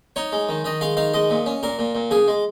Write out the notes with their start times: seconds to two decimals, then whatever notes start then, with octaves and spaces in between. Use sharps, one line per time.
0.16 D#4 C#5
0.32 G#3
0.49 D#3
0.64 D#3 D#5
0.81 G#3 F5
0.97 D#3 F5
1.14 G#3 D#5
1.30 A#2
1.46 C#4
1.63 A#2 A#4
1.79 A#2
1.95 A#2
2.11 C#3 G#4
2.28 G#3